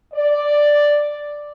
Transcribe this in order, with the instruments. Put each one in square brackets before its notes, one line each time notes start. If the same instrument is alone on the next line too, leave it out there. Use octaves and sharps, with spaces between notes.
[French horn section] D5